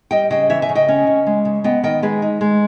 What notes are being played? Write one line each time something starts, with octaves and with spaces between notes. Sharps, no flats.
G3 D#5 G5
C#3 D#5 G5
E3 C#5 E5
E5 G#5
C#3
D#5 G5
C#4
C#3
G#3
C#3
B3 D#5 G5
D#3 D#5 G5
G#3 G#4 B4
D#4
G#3